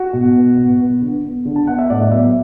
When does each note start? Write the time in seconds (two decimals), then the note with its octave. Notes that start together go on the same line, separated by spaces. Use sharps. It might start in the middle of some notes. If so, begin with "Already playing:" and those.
Already playing: F#4
0.13 B2
0.36 B3
0.57 B2
0.80 B3
1.02 D3
1.24 B3
1.45 D3
1.56 A5
1.67 B3 F#5
1.78 E5
1.90 A2 D5
2.02 D5
2.12 F#3 B3 E5